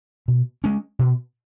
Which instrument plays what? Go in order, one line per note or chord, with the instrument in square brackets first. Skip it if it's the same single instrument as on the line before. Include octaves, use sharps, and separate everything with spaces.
[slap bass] B2
G#3 C#4
B2